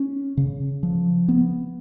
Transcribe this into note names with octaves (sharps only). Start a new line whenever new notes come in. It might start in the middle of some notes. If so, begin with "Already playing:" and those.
Already playing: C#4
C#3
F3
B3